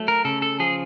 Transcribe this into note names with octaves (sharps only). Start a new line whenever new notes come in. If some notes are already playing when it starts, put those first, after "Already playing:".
Already playing: F#3 A3
A#4
C#3 A4
A4
F3 G#4